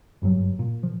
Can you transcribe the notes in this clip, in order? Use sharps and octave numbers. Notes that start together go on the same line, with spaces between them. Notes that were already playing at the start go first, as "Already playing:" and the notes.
F#1 G2 C3 F#3
A#2
F3